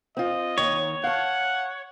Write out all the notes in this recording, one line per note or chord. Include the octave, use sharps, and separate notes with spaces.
C4 F4 D#5
D#2 D#3 C#5
F5 F#5 A5